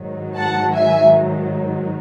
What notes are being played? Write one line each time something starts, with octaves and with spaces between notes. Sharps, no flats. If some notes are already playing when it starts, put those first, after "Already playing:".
Already playing: G#2 D#3 F#3
F#5 A5
E5 G#5